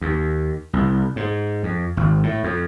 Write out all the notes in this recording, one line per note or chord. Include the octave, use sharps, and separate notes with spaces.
D#2
C2
G#2
F2
G#1
A2
F2